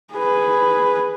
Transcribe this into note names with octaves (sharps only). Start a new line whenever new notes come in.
G#4 B4